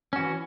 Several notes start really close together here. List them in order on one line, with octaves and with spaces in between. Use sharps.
C#4 F#4 E3